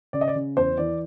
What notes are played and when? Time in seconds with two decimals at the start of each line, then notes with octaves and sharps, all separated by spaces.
0.13 C#3 D5
0.21 D#5
0.28 D5
0.36 C#3
0.57 E2 C5
0.78 E3 D5